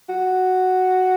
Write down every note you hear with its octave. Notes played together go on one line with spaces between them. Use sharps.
F#4